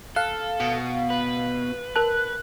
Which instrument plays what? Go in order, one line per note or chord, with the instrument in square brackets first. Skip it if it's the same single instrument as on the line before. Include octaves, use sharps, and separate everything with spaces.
[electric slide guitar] A4 [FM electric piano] F5 [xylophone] F#6
[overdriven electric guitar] B2
[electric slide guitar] B4
[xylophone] A#4 A5 [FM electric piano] F#6